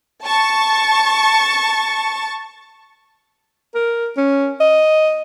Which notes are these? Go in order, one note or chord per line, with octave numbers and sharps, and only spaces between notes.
A5 C#6
A#4
C#4
D#5